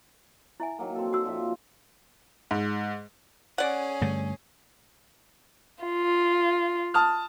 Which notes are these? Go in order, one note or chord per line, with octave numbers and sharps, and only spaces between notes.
E4 E5 G#5
D#3 F#3 A#3
C4 A4
F#4 E6
A#2 F3 E5
G#2
C#4 G#4 D5 F#5
G2 D3 A3
F4
A5 D#6 F6